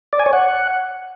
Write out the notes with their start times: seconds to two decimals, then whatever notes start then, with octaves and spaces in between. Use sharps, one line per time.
0.13 D5
0.19 G#5
0.26 C#5
0.33 F#5